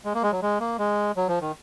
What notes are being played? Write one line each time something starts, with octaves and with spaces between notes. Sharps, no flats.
G#3
A#3
G#3
F#3
G#3
A#3
G#3
F#3
F3
D#3